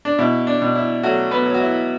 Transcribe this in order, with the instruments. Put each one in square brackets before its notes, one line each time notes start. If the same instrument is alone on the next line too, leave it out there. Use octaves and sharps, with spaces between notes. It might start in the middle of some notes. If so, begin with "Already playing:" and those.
[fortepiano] D4
B2 E4
D4
B2
E4
F#3 A3 F#4
B3 B4
F#3
F#4
E4